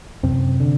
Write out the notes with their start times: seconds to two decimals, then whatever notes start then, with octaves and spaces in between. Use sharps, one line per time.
0.23 F#2 C3 C4
0.60 D3